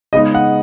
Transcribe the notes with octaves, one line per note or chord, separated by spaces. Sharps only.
C#3 G#3 B3 D#4 D#5
F#5